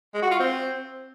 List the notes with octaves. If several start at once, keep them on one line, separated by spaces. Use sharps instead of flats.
G#3
F#4
F4
C4